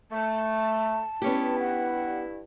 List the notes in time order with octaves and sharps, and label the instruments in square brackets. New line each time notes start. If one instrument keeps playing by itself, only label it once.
[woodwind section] A3 [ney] A5
[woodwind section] G2 E4 [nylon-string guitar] B3 C#4 G4
[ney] F#5